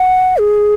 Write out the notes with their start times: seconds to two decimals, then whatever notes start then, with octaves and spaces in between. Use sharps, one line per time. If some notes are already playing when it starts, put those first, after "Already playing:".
Already playing: F#5
0.38 G#4